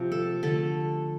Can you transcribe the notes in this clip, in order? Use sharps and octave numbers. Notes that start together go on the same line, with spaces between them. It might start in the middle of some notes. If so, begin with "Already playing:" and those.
Already playing: C3 F3
A4
D3 A3 A4